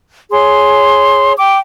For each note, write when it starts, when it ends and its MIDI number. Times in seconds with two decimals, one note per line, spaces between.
0.31 1.33 68
0.31 1.33 73
0.31 1.33 84
1.38 1.59 79
1.38 1.59 86